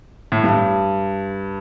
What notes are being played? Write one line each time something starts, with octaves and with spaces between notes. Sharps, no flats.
A2
G2